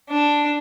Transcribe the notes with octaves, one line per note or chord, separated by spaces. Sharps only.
D4